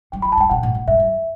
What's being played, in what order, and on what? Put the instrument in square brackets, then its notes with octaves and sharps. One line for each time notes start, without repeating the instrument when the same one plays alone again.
[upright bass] G3 [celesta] G5
[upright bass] F#3 [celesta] B5
[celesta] A5
[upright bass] G2
[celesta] G5
[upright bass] B2 [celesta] F#5
[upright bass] A2
A2
[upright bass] G2 [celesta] E5
[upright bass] F#2